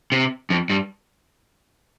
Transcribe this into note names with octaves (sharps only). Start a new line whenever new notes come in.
C3
F2
G2